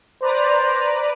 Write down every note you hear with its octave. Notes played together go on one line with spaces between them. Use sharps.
B4 C5 D5 A#5